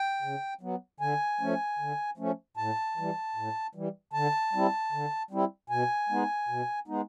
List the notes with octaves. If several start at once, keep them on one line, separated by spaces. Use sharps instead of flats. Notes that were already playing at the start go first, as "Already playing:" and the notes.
Already playing: G5
C#3
F#3 B3
D3 G#5
F3 A3 C#4
D3
F3 A3 C#4
A2 A5
E3 G3
A2
E3 G3
D3 A5
G3 C4 E4
D3
G3 C4 E4
B2 G#5
G#3 B3 D#4
B2
G#3 B3 D#4